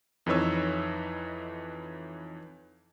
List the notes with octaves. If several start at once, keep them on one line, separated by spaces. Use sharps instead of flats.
F2 E3 D#4 B4 C#5 E6